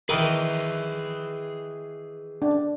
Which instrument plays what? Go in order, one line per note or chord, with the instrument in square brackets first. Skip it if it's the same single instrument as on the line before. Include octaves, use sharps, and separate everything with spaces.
[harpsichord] D#3 E3 B4 [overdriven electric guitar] G#4 E5 [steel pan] A#4
[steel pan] D4